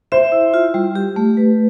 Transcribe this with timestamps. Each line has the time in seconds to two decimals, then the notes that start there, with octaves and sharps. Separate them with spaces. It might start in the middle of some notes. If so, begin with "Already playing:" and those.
0.12 C5 E5
0.32 E4
0.54 F4
0.74 G3
0.95 G4
1.16 A3
1.37 B4